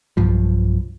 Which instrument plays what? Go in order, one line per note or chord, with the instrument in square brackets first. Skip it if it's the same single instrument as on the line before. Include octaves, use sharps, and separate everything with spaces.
[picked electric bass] B1 G2 F3